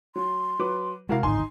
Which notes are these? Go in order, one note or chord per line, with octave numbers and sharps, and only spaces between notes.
F#3 C6
F#3 B4 D6
C3 G#3 E4 F#4 A#4 F5
D1 G#1 D#4 G#5 C6